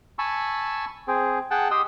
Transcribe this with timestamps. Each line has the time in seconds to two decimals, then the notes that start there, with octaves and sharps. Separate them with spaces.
0.19 G#5 A5 B5 C#6 E6
1.08 C4 G#4
1.51 G#4 F#5 G5 A5
1.71 G4 D#5 C6 D#6 E6